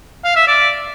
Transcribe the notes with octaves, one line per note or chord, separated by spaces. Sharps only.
F5
E5
D5